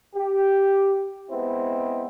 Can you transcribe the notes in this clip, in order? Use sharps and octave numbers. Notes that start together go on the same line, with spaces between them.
G4
G#3 B3 C4 E4